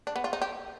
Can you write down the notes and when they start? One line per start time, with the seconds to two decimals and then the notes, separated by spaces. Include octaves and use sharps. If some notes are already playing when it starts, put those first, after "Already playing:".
0.07 D4
0.16 B3
0.24 F4
0.33 D#4
0.42 G4